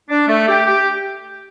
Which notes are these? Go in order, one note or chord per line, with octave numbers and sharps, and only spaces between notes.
D4
A3
G4
G4